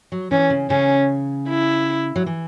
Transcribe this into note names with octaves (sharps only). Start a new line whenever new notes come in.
F#3
E3 C#4
C#3
C#3 C#4
E4
F#3
E3